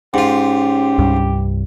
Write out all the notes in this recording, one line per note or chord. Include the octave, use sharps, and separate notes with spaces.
G#2 C#4 F4 G4
C2 G2 G3